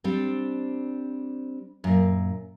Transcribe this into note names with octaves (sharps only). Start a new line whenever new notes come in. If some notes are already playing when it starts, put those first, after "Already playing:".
G3 C4 D4
F#2 A#2